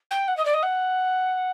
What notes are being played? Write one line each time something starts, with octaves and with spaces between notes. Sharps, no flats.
G5
F#5
D#5
D5
D#5
F#5